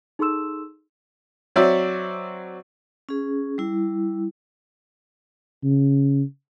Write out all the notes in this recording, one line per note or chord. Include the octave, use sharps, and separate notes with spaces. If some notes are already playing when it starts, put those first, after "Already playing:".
D#4 G#4 A4 C6 E6 E7
F#3 C4 C#5 D5 E5
C#4 G#4
G3 E4
C#3